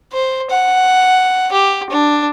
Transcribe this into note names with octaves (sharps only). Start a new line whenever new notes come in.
C5
F#5
G4
D4